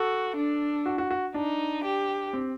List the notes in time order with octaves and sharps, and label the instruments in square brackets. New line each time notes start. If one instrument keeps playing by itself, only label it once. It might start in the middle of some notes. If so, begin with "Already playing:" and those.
Already playing: [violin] F#4 [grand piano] A4
[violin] D4
[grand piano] F#4
F#4
F#4
[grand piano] D4 [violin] D#4
[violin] G4
[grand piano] C4